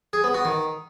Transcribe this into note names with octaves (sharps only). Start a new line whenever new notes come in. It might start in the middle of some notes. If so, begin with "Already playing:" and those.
G#4
B3
F#4
D#3